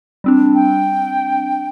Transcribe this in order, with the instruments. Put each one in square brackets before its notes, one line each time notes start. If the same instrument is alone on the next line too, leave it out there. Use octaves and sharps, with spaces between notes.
[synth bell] G3 C4 D4
[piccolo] G5